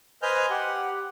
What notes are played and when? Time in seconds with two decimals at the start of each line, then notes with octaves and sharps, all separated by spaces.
0.22 B4 C5 D#5 G#5 F6 G6
0.50 G4 F#5